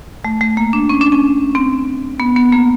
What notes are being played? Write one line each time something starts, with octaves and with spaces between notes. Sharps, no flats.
A3
A3
A#3
D4
C#4
D4
C#4
C4
B3
B3
A#3